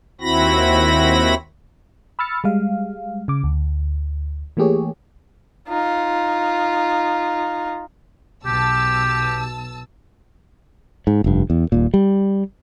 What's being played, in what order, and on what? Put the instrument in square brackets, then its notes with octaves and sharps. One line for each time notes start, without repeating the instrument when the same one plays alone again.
[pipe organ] D#2 C4 E4 F#4 B5 A#6
[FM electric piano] B5 E6 F6 A6 C#7
G3 G#3 F5
C#3 D6
D2
E3 A3 A#3 G4 G#4 C#5
[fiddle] D#4 F4
[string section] B1 A5 E6 [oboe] G4
[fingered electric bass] G#2
F1 G2
E2
D#1 A#2
G3